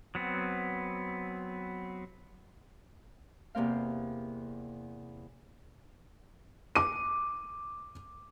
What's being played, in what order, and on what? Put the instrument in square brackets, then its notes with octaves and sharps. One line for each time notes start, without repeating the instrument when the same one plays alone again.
[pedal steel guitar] F#3 B3 C4
[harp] E2 C3 A#3 C4 F5
[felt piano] D6 D#7